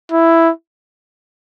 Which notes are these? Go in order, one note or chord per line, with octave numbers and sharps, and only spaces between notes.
E4